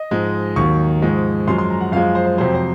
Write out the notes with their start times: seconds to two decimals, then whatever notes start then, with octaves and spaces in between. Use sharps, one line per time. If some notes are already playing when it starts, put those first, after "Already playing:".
Already playing: D#5
0.11 G#2 F3 G#3
0.56 D#2 D#3 F#3 C#6
1.02 G#2 F3 G#3
1.48 F#2 F3 G#3 C6
1.58 C6
1.70 A#5
1.81 F#5
1.92 F#2 F3 G#3 F5
2.15 C5
2.26 C5
2.37 F2 C3 F#3 C5
2.55 C5